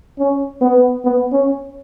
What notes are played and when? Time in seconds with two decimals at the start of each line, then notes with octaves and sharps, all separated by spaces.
0.19 C#4
0.61 B3
1.04 B3
1.32 C#4